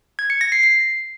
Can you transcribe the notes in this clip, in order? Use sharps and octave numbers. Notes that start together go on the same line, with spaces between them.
G#6
C#7
A#6
C7
C7